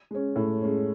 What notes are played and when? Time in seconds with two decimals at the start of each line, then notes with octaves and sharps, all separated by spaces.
0.11 G#3 C#4
0.36 A2
0.62 G#3 C#4